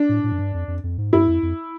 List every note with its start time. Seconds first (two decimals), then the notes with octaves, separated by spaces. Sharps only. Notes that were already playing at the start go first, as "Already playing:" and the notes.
Already playing: D4
0.09 A2
0.24 A2
0.32 F#2
0.39 G2
0.54 F2
0.68 F2
0.83 F2
0.98 G#2
1.13 G2 E4
1.28 F2
1.43 F2